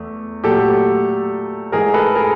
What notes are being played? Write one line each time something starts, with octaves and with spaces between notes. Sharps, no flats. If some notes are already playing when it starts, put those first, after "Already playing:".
Already playing: E2 A3
A#2 F#3 A3 G4 A4
G#2 E3 A3 G#4 A#4
A4 B4
G#4 A#4